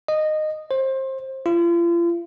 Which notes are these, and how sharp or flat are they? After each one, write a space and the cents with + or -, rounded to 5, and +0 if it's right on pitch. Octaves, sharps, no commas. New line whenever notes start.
D#5 -15
C5 +25
F4 -40